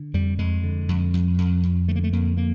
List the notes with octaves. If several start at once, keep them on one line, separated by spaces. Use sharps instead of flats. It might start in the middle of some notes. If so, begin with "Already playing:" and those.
Already playing: D3
F2 G3
F2 G#3
D3
F2
F2
F2
F2
D3 A3
A#3
A3
F2 A#3
D3 A#3